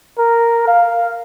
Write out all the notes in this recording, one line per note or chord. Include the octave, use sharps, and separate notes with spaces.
A#4
F5